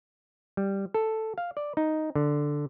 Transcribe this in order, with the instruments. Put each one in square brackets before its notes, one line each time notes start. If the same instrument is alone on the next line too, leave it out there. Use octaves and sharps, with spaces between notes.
[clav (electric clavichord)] G3
A4
F5
D5
D#4
D3